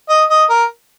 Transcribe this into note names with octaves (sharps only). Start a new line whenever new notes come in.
D#5
D#5
A#4